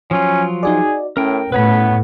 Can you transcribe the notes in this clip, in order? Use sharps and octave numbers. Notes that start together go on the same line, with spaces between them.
F3 F#3 C#4 F4
D#4 F#4 G#4 D5
A2 C#4 A#4 G5
A2 B3 B4 C#5 B5